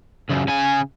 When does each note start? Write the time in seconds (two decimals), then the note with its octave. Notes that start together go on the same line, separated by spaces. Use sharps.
0.29 C#2 F#2
0.47 C#3 G#5